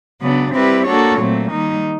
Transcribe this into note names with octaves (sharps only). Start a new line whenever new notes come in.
C#3 F#3 B3 D4
G3 C4 E4 G4 B4
A#3 D4 F#4 A4 C#5
A#2 F#3 A3 C4
D#3 G3 A#3 D#4